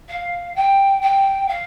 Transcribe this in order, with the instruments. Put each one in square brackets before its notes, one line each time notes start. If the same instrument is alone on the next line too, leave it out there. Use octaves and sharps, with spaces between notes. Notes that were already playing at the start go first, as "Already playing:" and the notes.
[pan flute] F5
G5
G5
F5